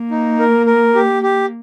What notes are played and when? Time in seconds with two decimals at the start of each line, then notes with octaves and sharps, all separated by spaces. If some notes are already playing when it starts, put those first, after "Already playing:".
Already playing: A#3
0.11 D#4
0.39 A#4
0.66 A#4
0.95 G4
1.23 G4